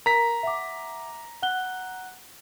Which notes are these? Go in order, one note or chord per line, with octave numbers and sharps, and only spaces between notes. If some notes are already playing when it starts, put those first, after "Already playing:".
A#4 A#5 B6
E5 F#5 D6
F#5 F#6 G7